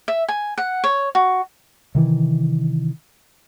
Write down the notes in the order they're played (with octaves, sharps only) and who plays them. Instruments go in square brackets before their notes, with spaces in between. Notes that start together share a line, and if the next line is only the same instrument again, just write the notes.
[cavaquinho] E5
G#5
F#5
C#5
F#4
[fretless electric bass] C3 D#3 E3